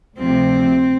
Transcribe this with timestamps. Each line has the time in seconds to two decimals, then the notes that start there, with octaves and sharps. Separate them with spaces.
0.20 D2 C3 F3 C4